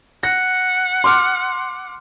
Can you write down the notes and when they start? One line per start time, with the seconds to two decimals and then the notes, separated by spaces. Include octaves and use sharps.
0.23 F#5 A#6
1.04 C6 D6 F6